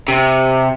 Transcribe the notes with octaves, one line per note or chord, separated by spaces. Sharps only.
C3